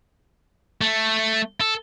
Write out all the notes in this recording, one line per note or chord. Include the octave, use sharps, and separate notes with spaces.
A3
A4